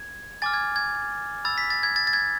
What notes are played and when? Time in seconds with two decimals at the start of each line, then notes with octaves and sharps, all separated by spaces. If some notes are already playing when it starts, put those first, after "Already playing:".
Already playing: G#6
0.42 G#5 D6 F6 A6
0.54 G#6
0.76 G#6
1.45 B5 E6 A6
1.58 B6
1.70 A6
1.83 G#6
1.96 A6
2.07 A6
2.13 G#6